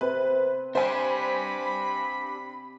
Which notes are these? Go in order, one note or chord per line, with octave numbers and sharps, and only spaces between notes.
C3 B4
D4 G4 C5 G#5 B5